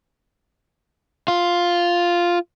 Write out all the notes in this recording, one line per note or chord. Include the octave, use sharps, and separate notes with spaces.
F4